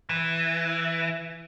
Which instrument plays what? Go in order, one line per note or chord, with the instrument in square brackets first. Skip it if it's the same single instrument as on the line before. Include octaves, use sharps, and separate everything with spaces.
[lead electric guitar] E3